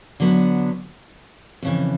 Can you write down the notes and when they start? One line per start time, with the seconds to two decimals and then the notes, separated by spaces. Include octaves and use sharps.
0.20 D3 F#3 B3 D4
1.62 F2 C#3 E3